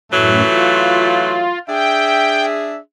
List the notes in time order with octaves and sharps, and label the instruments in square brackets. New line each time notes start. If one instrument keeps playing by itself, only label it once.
[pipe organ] F#2 A2 [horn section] E3 F#3 A3
[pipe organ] F4
[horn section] D4 G#4 E5 [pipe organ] G5